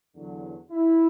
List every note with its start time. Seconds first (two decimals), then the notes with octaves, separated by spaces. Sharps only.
0.15 E2 D3 F#3
0.70 E4